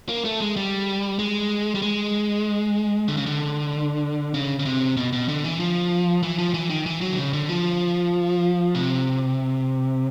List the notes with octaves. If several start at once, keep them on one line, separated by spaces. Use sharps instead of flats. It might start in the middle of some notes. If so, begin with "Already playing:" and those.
A#3
A3
G#3
G3
G#3
G3
G#3
D3
C#3
D3
C#3
C#3
C3
B2
B2
D3
E3
F3
E3
F3
E3
D#3
E3
F#3
D3
C#3
D3
F3
C3